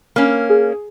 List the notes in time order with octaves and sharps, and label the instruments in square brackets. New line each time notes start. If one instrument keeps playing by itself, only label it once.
[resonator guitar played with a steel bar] A#3 C#4
[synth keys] G#4